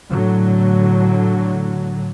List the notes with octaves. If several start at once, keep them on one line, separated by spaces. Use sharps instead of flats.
A2 D3 F#3